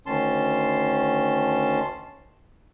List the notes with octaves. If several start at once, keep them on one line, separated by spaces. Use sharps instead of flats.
D2 D#3 C#4 A5 C6